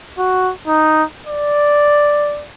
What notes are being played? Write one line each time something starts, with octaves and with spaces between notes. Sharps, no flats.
F#4
D#4
D5